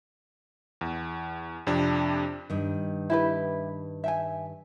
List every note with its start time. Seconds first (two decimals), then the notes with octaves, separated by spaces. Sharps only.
0.81 E2
1.67 F2 C3 D4
2.50 G2 D#3
3.10 E4 G4 B4
4.04 E5 G5 G#5